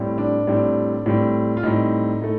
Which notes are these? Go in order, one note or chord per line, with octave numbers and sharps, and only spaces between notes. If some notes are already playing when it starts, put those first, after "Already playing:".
Already playing: A2 G3 C4
D4
A2 G3 C4
A2 G3 C4
F4
A2 G3 C4 D#4
A2 A3